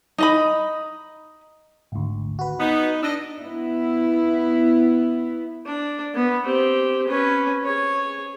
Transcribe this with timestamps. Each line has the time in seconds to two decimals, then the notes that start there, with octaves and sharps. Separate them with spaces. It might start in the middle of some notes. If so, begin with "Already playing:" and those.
0.18 D#4 D#5 B5
1.92 G#1 D2
2.39 F#4 B4
2.60 B3 D#4
3.03 D4 D#5 E6
3.40 B3 E4
5.66 D4
6.15 B3
6.45 C4 G4
7.07 C#4 B4
7.64 G#4 C#5